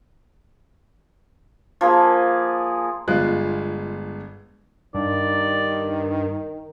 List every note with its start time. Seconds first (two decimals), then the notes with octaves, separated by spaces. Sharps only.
1.81 F3 A#3 G#4
3.08 G1 G#3 F4 F#6
4.94 G2 D#3 D5